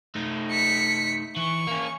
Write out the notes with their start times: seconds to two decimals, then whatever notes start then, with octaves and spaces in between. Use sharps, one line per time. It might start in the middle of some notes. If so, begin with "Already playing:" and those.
0.15 A3 D#4
0.51 B6 C#7
1.36 E3 C#6
1.67 A#3 C#4